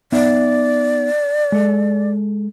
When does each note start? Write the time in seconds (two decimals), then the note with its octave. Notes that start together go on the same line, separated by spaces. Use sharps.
0.12 B3 D#4 D5 E5
1.52 G#3 A4